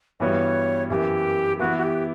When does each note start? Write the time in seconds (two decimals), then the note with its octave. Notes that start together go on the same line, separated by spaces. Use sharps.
0.20 G2 E3 G3 B3 F#4 C#5
0.90 F#2 E3 A#3 G4
1.59 E3 B3 E4 F#4
1.78 F#4
1.83 G4